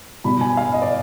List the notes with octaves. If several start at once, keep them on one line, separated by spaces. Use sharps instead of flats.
B2 G3 B5
G#5
F5
D#5
D5